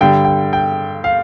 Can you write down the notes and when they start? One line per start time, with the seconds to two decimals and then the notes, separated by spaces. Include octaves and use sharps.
0.01 G2 D3 G3 G5
0.25 G5
0.53 G5
1.04 F5